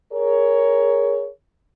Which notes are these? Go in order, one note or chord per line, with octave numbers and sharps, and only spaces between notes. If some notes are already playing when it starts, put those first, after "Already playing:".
G#4 A#4 C#5